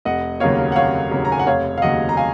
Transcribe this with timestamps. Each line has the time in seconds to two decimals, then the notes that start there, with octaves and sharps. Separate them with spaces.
0.05 F1 D#5 F#5
0.40 D#2 C#3 F#3 A#3 C#5 F5
0.72 F#5
0.76 F1 C#5 F5
1.11 D#2 C#3 F#3 A#3
1.25 A#5
1.32 G#5
1.39 F#5
1.47 F1 C#5 F5
1.78 F5
1.82 D#2 C#3 F#3 D#5 F#5
2.09 A#5
2.17 F5 G#5